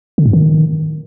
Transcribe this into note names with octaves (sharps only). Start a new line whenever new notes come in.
D3
G#2
D#3